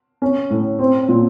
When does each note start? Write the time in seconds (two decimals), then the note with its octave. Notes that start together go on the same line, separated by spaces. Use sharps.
0.22 C#4
0.50 A2
0.79 C4
1.09 A#2